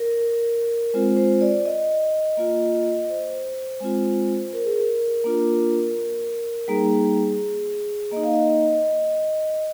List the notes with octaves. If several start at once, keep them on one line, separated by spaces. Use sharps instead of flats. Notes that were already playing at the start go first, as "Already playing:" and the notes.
Already playing: A#4
G#3 C4 F4 C5
C5
D5
D#5
A#3 F4
C5
G#3 C4 F4
A#4
G#4
A#4
A#3 D4 F4
G3 A#3 D#4 G#4
A#3 D#4 D#5
F5
D#5